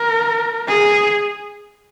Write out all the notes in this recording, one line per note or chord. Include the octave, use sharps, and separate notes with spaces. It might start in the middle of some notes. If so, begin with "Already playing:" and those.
Already playing: A#4
G#4